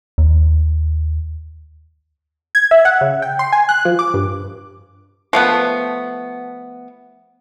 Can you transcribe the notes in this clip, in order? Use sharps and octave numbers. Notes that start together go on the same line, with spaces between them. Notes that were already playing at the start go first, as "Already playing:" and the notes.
D#2
G#6
E5
F#5
C#3
G5
C6
G#5
F#6
F3
D6
G2
F3 A3 B3